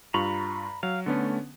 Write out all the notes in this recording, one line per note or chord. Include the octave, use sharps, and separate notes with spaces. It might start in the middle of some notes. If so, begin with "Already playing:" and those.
G2 F4 A#5 B5 C#6
F#3 F5
D3 A3 B3 C#4